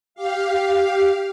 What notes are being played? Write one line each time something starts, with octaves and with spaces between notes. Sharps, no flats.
G4 F5